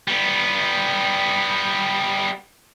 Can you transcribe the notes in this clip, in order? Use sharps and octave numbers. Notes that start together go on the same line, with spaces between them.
G3 B3